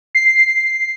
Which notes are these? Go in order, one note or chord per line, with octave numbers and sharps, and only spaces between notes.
C7